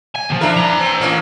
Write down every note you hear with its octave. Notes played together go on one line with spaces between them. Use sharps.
G#5
D#2 F3
D4 E4 A#4
E3 A#5
C4
A2 A#3 C#4